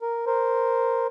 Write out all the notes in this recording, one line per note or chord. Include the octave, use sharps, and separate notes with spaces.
A#4
A#4 C5